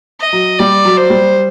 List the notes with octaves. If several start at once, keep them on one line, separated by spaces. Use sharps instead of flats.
D#5
F#3
G3 D5
F#3
C5
G3